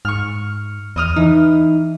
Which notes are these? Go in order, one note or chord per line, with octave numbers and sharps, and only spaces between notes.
G#2 C#6 F6
E2 D#5 D#6 F6
E3 D#4